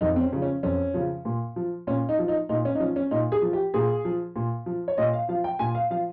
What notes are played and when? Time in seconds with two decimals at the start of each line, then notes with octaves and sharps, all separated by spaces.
0.01 F2 D#4
0.16 C4
0.21 C#4
0.33 C#3 F3
0.42 C#4
0.63 F2 C#4
0.94 C#3 F3
1.25 A#2
1.56 F3
1.87 A#2 C#4
2.09 D#4
2.19 F3
2.28 D#4
2.49 A#2 D#4
2.65 C#4
2.75 D#4
2.80 F3 C#4
2.96 C#4
3.11 A#2 D#4
3.32 G#4
3.42 F3
3.53 G4
3.74 A#2 G#4
4.05 F3
4.36 A#2
4.66 F3
4.88 C#5
4.98 A#2 D#5
5.13 F5
5.29 F3 F5
5.44 G5
5.59 A#2 G#5
5.75 F5
5.91 F3 F5